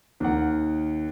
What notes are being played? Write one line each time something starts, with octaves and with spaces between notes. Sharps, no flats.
D#2 D#3 F#5